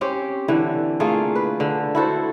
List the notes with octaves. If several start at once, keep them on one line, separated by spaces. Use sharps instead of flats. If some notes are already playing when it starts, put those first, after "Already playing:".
C4 C#4 G4 C5
D3 E3
A3 A#3 F4 G#4
B4
D3
E4 F#4 A4 C5